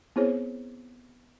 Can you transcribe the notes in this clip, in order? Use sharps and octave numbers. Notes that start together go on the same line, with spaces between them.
B3 C4 E4 G#4 C5 C#5